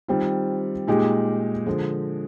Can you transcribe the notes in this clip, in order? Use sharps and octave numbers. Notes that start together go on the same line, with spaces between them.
D#3 G3 C4 F4
A#2 G#3 D#4 G4
D3 F3 G#3